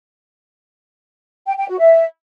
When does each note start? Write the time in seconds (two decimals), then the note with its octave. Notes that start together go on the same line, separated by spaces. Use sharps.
1.46 G5
1.57 G5
1.68 F#4
1.79 E5